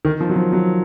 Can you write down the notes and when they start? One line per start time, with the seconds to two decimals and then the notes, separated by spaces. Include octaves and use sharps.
0.05 D#3
0.20 F3
0.29 F#3
0.36 F3
0.53 F#3